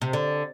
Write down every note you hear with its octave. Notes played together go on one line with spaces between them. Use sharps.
C3
D3